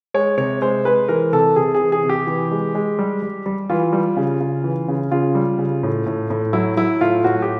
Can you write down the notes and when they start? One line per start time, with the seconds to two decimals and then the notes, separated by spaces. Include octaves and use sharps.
0.14 G#3 C#5
0.37 C3 C#5
0.62 G#3 C5
0.85 G#3 B4
1.08 E3 A#4
1.32 C3 A4
1.56 C3 G#4
1.75 G#4
1.80 E3
1.92 G#4
2.04 C3
2.09 G4
2.27 E3
2.51 G#3
2.75 G#3
2.99 G3
3.22 G3
3.46 G3
3.70 E3 F4
3.93 G3
4.17 C#3
4.40 C#3
4.64 E3
4.88 C#3
5.11 C#3 F4
5.35 G3
5.58 C#3
5.83 A2
6.06 A2
6.30 A2
6.53 F#3 E4
6.77 F#3 E4
7.01 A2 F4
7.24 A2 F#4
7.42 G4